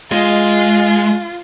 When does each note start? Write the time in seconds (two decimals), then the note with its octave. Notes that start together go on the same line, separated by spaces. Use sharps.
0.12 G#3 F4